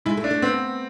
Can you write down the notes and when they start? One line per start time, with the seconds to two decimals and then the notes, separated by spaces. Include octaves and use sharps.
0.06 G#3 E4
0.17 A3
0.24 D4
0.31 A3
0.42 B3 C4